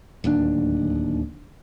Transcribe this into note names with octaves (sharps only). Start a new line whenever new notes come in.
D1 D#2 D3 D4